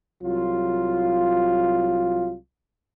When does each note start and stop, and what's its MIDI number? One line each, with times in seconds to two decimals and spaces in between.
0.22 2.35 36
0.22 2.35 54
0.22 2.35 65